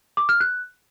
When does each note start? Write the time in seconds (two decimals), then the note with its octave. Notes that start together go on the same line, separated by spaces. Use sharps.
0.17 D6
0.29 F6
0.40 F#6